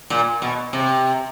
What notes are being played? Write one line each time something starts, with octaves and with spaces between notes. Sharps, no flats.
A#2
B2
C3